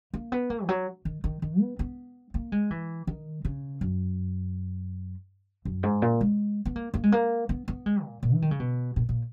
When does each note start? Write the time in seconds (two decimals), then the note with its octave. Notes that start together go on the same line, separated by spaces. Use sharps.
0.14 A#3
0.32 B3
0.50 A#3
0.64 E3
0.69 F#3
1.05 D#3
1.24 D#3
1.42 D#3
1.60 B3
1.79 B3
2.34 A#3
2.52 G#3
2.71 E3
3.07 D#3
3.45 C#3
3.81 F#2
5.65 F#2
5.83 G#2
6.02 A#2
6.21 G#3
6.65 B3
6.76 A#3
6.94 A#3
7.03 G#3
7.12 A#3
7.49 B3
7.68 B3
7.86 G#3
8.05 A#2
8.23 A#2
8.34 E3
8.42 D#3
8.51 C#3
8.60 B2
8.96 A#2
9.09 A#2